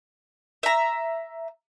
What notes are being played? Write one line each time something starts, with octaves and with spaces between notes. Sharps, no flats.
E5 A#5